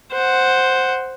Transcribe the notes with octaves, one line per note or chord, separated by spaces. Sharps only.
C5 F#5